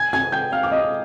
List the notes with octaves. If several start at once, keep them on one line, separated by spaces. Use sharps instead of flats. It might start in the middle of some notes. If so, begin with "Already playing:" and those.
Already playing: G#5 G#6
G#5 G#6
G5 G6
F5 F6
D6
D#5 D#6